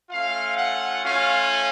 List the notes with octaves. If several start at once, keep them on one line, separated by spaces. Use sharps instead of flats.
A3 C#4 F4 F5
F#5
A3 C#4 F4 F5